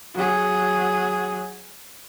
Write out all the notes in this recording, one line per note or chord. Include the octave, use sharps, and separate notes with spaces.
F#3 G#4